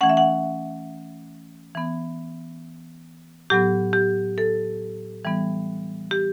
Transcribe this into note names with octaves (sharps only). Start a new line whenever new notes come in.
E3 A3 C#4 F#5
E5
F#5
E3 B3
A2 F#3 B3 G4
G4
A4
E3 G3 B3
G4